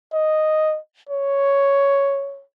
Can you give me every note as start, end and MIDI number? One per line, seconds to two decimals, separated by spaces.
0.13 0.78 75
1.09 2.44 73